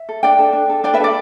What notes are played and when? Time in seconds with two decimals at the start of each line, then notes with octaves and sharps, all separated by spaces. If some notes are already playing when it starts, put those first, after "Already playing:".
Already playing: E5
0.09 A4
0.23 D4 D5 G5
0.39 A4
0.53 D4
0.69 A4
0.84 D4 D5 G5
0.94 B4 E5
1.00 A4 D5